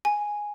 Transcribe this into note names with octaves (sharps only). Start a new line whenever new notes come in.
G#5